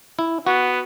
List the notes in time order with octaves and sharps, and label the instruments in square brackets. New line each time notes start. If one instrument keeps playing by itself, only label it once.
[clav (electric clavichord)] E4
[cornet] B3 [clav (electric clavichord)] F#4